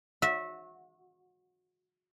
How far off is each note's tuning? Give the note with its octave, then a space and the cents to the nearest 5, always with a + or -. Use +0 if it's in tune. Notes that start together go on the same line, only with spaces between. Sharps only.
F#4 -30 E5 -15